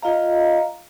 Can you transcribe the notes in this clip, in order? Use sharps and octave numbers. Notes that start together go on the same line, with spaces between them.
F4 D#5 F5 A#5